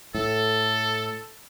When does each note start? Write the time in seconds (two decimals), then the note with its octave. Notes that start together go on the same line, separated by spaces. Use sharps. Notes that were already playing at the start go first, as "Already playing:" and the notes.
0.15 A2 A4